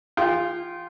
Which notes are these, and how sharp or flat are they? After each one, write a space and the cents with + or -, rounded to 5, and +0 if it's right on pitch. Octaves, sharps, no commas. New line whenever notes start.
F4 +0 G#4 -45 G5 -25